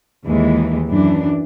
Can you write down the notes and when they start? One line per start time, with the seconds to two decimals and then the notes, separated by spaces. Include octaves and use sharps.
0.25 D#2 E3 G#3
0.88 F#2 E3 D4